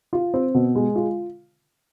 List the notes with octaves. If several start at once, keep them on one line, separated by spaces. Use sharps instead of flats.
F4
C4
B2
G#3
F4